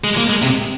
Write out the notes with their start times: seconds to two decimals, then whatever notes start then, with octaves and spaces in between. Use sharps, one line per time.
0.04 G#3
0.17 A#3
0.30 G#3
0.42 C3